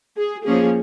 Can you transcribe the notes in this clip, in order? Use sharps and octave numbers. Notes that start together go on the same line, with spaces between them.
G#4
F3 A#3 C#4 G#4